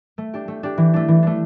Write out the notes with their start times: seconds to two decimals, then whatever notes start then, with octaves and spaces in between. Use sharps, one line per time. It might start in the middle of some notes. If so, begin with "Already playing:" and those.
0.18 A3
0.34 D4 G4
0.48 A3
0.63 D4 G4
0.78 E3
0.94 A3 D4
1.08 E3
1.23 A3 D4